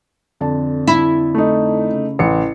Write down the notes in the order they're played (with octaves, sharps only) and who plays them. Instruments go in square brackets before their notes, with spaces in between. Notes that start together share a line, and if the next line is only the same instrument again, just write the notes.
[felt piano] F2 D3 A5
[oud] E4
[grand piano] A3 D#4
[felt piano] C#3
[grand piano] A1 C#7